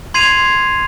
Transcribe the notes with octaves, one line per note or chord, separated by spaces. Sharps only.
C6 G#6 C7 D#7 F7